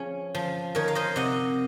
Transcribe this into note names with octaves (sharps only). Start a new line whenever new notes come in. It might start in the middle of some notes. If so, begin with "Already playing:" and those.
Already playing: F3 C#4 G#4
F3
D#3 A#4 C#5
F5
C5 D#5
C3 D#5 F#5